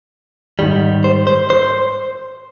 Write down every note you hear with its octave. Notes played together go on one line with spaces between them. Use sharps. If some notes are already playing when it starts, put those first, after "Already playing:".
G#2 D#3 G3
C5
C5
C5